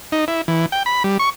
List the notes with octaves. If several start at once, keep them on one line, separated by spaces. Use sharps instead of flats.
D#4
E4
E3
G5
B5
G3
C#6